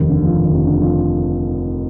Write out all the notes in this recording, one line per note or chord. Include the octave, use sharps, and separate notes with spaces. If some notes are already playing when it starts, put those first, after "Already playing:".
Already playing: F1 D#2
D3
F3
D#2
F1
D3
F3